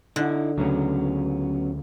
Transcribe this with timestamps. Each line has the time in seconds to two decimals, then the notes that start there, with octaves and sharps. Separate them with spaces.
0.16 D3 D#4 E4 D5
0.58 D2 C#3 F#3 B3 C#4